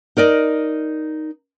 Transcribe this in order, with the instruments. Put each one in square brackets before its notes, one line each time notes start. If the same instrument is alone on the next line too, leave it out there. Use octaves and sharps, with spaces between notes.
[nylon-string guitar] D#4 A#4 D5 D#5